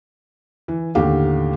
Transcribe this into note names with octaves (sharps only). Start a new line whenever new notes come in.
E3
D#2 A2 D3 G4 F5